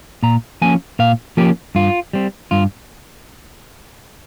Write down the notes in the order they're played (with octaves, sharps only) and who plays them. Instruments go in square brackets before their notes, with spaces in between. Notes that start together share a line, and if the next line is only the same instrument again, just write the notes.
[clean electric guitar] A#2 A#5
F3 A#3 C#4 G#5
A#2 F5
F3 A#3 C#4 G4
G2 F4
G3 C4
G2 F4